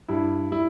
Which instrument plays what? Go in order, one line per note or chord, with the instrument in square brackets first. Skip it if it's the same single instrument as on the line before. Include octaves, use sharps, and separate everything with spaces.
[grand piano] G2 G3 E4
G3 E4